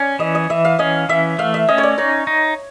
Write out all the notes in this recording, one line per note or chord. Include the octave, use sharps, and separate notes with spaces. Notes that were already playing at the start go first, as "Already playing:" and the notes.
Already playing: C#4 D5
E3 D#5
D#5
E3 E5
F5
C#4 D#5
E3 E5
A3 F5
E5
C#4 D#5
C#5
D5
D#4 C#5
D#4